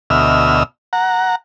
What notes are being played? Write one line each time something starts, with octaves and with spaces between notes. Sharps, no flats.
D2 B2 D#5 E5 E6 F6
F#5 A#5